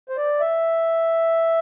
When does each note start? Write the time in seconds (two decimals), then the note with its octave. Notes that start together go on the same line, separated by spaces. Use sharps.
0.09 C5
0.17 D5
0.40 E5